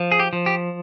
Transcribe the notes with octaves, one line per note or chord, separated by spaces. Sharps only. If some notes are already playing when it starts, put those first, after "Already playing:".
Already playing: F3
G#4
G4
F3
G4